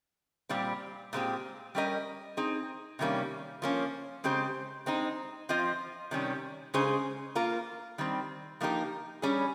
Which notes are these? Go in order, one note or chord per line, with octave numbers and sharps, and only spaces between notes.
A#2 G3 C4 G4
A#2 G#3 C4 G4
G3 C#4 G4 A#4 D#5
C4 D#4 G#4
C3 D#3 G3 A#3 C#4
F3 A#3 C#4
C#3 G#3 C4 G4 C5
G#3 C4 D#4
F3 C4 F4 C5 D#5
C3 D#3 G3 C#4
C#3 G#3 C#4 G#4 C5
A#3 F4 A#4
D#3 G3 C4
F3 A#3 D#4 G4 A#4
G3 C#4 G#4